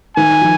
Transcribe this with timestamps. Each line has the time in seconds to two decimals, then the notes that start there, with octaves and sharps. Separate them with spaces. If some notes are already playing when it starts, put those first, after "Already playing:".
0.17 D#3 G#5
0.41 F3